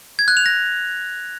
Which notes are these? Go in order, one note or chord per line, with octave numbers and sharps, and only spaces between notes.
G#6
F#6
F7
A#6